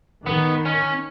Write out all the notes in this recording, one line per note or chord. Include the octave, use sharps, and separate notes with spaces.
D#3 B3
C#4